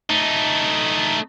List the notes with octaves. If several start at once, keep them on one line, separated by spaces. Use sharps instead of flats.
A3 D#4